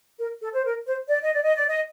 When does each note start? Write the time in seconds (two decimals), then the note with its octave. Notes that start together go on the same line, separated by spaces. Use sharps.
0.19 A#4
0.41 A4
0.53 C5
0.64 A#4
0.86 C5
1.08 D5
1.21 D#5
1.32 D5
1.43 D#5
1.56 D5
1.68 D#5